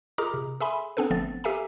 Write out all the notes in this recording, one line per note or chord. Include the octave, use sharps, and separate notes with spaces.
F4 G#4 A#4 D#5 A#5 D6
C3
G#4 A4 E5 G#5 B5 C6
B3 C4 D4 A4 B4
G1 F3 A3 B3 C4 A6
G4 A4 E5 F5 G#5 A#5